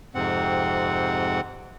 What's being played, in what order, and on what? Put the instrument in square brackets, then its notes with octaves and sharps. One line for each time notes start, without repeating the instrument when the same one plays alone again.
[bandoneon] F2 G#2 C3 C4 F#5